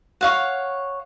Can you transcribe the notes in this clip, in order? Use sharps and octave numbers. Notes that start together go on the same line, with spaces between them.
C#5 F5 F#5